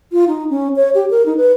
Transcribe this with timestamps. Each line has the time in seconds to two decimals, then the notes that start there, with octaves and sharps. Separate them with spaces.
0.12 F4
0.28 D#4
0.50 C#4
0.76 C#5
0.95 G4
1.11 A#4
1.26 D#4
1.37 B4